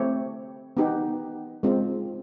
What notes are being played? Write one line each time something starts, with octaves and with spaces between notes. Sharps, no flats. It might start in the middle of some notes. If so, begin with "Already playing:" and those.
Already playing: A3 C4 E4 G4 C#5
B3 D#4 G4
G#3 C4 F4